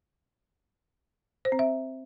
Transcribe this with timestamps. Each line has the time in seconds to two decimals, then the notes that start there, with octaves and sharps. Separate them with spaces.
1.45 C5
1.52 C4
1.59 E5